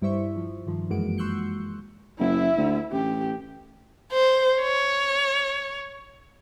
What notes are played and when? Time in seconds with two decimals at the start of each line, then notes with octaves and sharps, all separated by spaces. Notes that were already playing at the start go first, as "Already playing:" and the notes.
0.02 G2 G3 E4 C5 E5 C#6
0.36 F3
0.66 G2 D#3 F3
0.90 F#2 E3 G#3 A#3 F#4 D7
1.18 C6 C#6 E6 F#6 G6 C#7
2.20 F#1 E4 E5
2.57 D2
2.92 A1 G4
4.13 C5
4.61 C#5